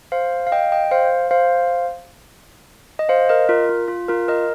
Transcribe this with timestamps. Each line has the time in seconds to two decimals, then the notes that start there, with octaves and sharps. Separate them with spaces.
0.12 C5 F5
0.47 F5
0.52 D#5 G5
0.72 D#5 G5
0.91 C5 F5
1.31 C5 F5
2.99 D#5
3.09 C5 F5
3.29 A#4 D#5
3.49 F4 A#4
3.69 F4
3.88 F4
4.08 F4 A#4
4.28 A#4 D#5